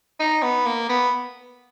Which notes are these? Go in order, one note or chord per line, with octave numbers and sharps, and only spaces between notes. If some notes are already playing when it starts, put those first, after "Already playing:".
D#4
B3
A#3
B3